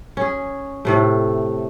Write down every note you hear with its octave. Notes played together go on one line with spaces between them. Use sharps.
C#4 G#4
A2 C3 A3